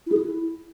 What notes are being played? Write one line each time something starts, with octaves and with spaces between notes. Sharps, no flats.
E4
G#4
E4